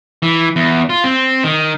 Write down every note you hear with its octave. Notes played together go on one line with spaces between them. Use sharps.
E3
E2
F4
C4
D#3